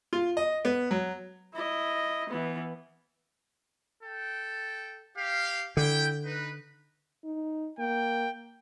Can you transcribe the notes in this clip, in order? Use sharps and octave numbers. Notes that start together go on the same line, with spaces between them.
F4
D#5
B3
F#3
E4 D#5
E3 B3
A4 G5
G4 F5
D3 E4 G5
D#4 B4
D#4
A#3 G5